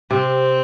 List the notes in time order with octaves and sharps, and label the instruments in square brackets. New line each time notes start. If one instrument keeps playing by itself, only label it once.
[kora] C3 [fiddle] C4